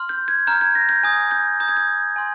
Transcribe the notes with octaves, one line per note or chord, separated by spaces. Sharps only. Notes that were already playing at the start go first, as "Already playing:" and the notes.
Already playing: C6 F6
G6
G#6
A#5 F6 G6
G#6
A#6
G6
G#5 D#6 G6 G#6
G6
A#5 D#6 G6
G#6
G6
G#5 C6